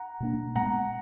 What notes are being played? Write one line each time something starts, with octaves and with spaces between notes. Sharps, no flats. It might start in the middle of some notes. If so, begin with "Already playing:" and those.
Already playing: F#5 A#5
B2 A#3 D4
A#2 G#3 B3 F#5 A#5